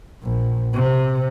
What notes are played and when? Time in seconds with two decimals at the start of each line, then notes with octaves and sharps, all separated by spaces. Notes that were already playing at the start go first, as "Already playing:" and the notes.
0.23 A#1
0.73 C3